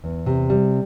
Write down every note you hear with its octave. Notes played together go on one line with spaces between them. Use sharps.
E2
C3
G3